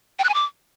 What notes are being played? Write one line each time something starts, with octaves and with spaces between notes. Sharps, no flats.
G5
F#6
G#5
D6